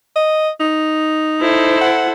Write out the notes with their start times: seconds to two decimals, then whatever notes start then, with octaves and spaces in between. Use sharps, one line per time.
0.16 D#5
0.61 D#4
1.40 E4 A4 C5
1.81 F#5